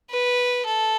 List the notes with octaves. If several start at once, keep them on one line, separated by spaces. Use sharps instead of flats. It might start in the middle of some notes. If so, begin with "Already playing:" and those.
B4
A4